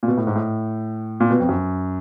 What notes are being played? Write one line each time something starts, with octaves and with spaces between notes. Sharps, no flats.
A#2
B2
A2
G#2
A2
A#2
B2
F2
F#2